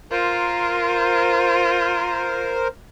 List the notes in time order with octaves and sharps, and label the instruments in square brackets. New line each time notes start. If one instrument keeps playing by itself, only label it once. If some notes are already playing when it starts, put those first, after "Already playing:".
[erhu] F4 [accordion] A#4 C5